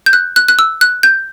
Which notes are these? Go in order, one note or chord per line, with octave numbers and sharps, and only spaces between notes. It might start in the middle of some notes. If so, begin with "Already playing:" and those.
G6
F#6
F#6
F#6
E6
F#6
G6